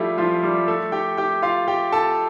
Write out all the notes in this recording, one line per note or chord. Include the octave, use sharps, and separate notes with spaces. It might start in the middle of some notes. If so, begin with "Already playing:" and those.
Already playing: F3 G3 A3 E4 F4 G4 A4
F3 F4
G3 G4
A3 A4
G4 G5
G4 G5
F4 F5
G4 G5
A4 A5